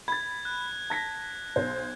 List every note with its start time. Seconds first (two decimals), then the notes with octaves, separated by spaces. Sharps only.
0.08 B5 G#6 A6
0.45 F#6
0.90 A5 A#6 B6
1.56 B1 C5